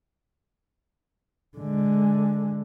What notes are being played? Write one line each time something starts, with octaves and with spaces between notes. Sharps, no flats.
D3 G#3